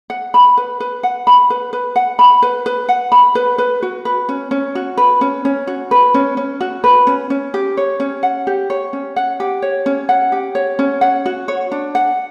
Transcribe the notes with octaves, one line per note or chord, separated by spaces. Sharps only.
F#5
B5
B4
B4
F#5
B5
B4
B4
F#5
B5
B4
B4
F#5
B5
B4
B4
F#4
B4
C#4
C#4
F#4
B4
C#4
C#4
F#4
B4
C#4
C#4
F#4
B4
C#4
C#4
G4
C#5
C#4
F#5
G4
C#5
C#4
F#5
G4
C#5
C#4
F#5
G4
C#5
C#4
F#5
F#4
C#5
D4
F#5